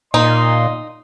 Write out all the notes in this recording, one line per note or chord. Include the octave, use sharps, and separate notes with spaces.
A#2 D#4 D#5 C6